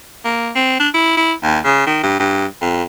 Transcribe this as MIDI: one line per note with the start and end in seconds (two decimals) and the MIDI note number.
0.25 0.50 58
0.55 0.79 60
0.80 0.89 62
0.94 1.17 64
1.17 1.33 64
1.43 1.59 39
1.64 1.85 49
1.86 2.02 51
2.03 2.19 43
2.19 2.46 43
2.61 2.83 41